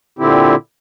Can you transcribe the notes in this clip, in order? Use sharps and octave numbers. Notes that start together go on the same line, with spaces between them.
A#2 D3 C4 E4 G4